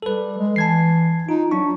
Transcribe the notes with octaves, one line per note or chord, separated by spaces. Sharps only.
G3 A4 B4
G#3
E3 A5 G#6 C7
D#4 F4
F#3 D4 A5 C#6